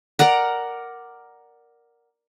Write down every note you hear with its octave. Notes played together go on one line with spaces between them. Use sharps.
A#4 D5 F#5 A#5